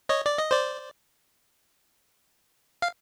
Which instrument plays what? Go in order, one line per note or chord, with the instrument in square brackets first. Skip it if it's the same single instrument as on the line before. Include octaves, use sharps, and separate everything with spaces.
[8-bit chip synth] C#5 D#5
D5
D#5
C5 D5
F5